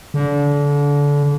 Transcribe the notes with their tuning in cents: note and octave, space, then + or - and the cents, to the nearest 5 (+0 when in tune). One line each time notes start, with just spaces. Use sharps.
D3 -30